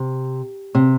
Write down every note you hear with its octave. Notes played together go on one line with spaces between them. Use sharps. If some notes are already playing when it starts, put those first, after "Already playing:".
Already playing: C3
C3